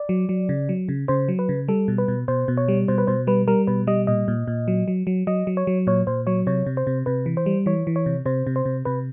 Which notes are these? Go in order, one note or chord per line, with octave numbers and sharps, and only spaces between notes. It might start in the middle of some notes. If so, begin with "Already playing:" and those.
Already playing: D5
F#3
F#3
C#3
F#3
C#3
C#3 C5
F#3
B4
C#3
G3 A4
B2
B4
B2
B2 C5
B2
C#5
G3
B2 C5
B4
B2 C5
G3 B4
G3 A#4
B2 B4
G3 D#5
A#2 D#5
A#2
A#2
F#3
F#3
F#3
F#3 D#5
F#3
C#5
F#3
A#2 C#5
A#2 C5
F#3 C#5
C3 C#5
C3
C5
C3
C3 B4
E3
C5
G3
E3 C#5
E3
C#5
C3
C3 C5
C3
C5
C3
C3 B4